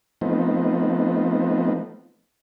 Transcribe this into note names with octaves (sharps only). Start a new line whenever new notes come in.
F3 A3 B3 C4 D#4